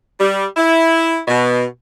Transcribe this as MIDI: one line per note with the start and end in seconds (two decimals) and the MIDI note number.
0.20 0.44 55
0.57 1.18 64
1.28 1.64 47